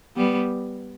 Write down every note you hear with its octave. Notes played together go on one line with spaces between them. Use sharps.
G3 B3